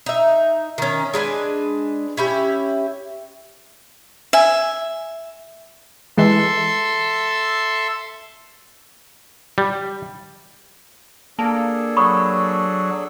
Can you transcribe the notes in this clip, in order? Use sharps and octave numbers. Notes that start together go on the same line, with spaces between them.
D#4 E5
D#3 C#4
G#3 D4 B4 G#5
C#4 E4 G4
E5 G#5
E3 G#3 A4 E5 C6
G3
A#3 D4 G#4 A4 A5
F#3 B5 C#6 D#6